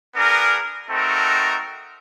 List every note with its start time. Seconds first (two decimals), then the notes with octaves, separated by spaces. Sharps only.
0.15 B3 D4 G#4 A#4
0.90 A3 C4 D#4 F#4 A4 A#4